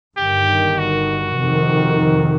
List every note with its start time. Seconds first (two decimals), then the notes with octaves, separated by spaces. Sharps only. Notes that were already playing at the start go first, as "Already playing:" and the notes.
0.17 G1 G2 D#3 G4
0.78 F#4
1.39 F2 C3 D#3